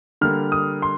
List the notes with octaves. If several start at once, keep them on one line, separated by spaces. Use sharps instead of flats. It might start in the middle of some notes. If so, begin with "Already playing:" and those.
D3 G3 A#3 F6
D#6
C6